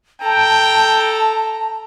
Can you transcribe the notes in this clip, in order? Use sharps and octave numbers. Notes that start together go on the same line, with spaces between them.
A4 G5 A5 A#5